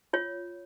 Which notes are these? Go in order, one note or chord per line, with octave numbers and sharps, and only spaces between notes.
F4 C#5